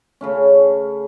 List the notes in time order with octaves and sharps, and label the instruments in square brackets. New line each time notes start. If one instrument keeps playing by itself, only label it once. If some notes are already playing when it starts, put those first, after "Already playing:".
[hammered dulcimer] C#3 A3 C#4